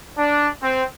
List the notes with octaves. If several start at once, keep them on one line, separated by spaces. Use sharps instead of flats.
D4
C4